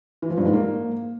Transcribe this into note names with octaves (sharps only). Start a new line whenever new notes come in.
E3
F3
G2
G#2
A#3